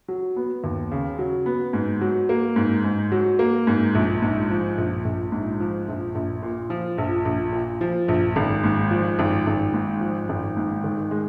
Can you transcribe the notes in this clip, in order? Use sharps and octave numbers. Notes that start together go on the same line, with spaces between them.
F#3
B3
D#2
C#3
F#3
B3
G#2
F#3
A#3
G#2
G#2
F#3
A#3
G#2
A#1
G#2
F3
A#1
A#1
G#2
F3
A#1
A#1
A#2
F3
A#1
A#1
A#2
F3
A#1
G#1
G#2
F3
G#1
G#1
G#2
F3
G#1
G#2
D#3
G#3